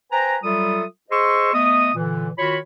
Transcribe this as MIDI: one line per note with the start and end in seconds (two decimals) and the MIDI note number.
0.11 0.37 71
0.11 0.37 72
0.11 0.37 79
0.11 0.37 80
0.11 0.37 82
0.44 0.84 54
0.44 0.84 55
0.44 0.84 65
0.44 0.84 69
0.44 0.84 76
0.44 0.84 87
1.11 1.51 68
1.11 1.51 72
1.11 1.51 75
1.11 1.51 84
1.11 1.51 85
1.11 1.51 88
1.53 1.90 57
1.53 1.90 59
1.53 1.90 75
1.53 1.90 87
1.95 2.29 46
1.95 2.29 50
1.95 2.29 52
2.38 2.58 51
2.38 2.58 65
2.38 2.58 66
2.38 2.58 73
2.38 2.58 83